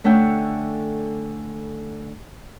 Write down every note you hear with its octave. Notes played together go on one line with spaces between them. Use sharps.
D3 A3 C#4 E5 F#5 G5